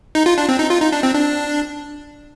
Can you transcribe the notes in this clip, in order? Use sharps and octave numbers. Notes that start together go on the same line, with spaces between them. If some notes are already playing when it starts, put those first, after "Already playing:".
D#4
F4
D4
C4
D#4
F4
D#4
D4
C4
D4